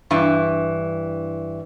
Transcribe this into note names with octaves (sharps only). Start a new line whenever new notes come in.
G2 E3